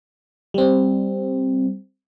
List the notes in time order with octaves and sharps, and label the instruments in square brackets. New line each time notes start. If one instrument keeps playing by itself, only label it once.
[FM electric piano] G3 C4